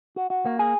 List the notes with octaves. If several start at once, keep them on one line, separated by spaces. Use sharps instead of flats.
F#4
F#4
A#3
G#4